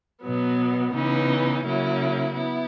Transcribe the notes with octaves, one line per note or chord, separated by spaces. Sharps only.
B2 F#3 B3
C#3 E3 B3 D#4
C#3 F#3 A#3 E4
B3 E4